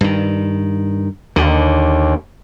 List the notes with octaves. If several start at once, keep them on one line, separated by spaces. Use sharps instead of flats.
G2 D#3
D#2 D3